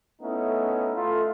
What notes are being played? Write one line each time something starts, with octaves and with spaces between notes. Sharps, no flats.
A3 B3 C#4 D#4 E4
A3 F4